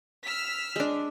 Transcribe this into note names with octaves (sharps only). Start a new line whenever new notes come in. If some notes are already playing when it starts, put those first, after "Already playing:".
E6 F6 B6
G#3 D4